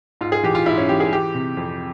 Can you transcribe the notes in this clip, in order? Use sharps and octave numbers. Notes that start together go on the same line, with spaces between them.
G#2 F4
G#4
E3 G4
F4
G#2 E4
C#4
E3 G4
G#4
E3 G4
C3
F2